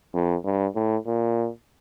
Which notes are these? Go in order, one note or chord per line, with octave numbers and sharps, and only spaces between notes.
F2
G2
A2
A#2